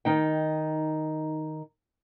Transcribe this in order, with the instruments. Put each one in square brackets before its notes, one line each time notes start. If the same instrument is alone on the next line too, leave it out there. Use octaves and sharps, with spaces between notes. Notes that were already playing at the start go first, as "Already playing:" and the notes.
[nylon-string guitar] D#3 D#4 G5